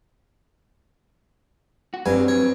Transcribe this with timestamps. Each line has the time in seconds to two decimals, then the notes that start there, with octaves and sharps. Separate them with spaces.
1.94 F#4
2.06 G2 F#3 C4 G#5
2.28 C#5